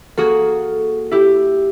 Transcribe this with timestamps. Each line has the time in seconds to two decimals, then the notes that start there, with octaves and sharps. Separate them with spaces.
0.18 A#3 F#4 G#4 A4
1.11 E4 G4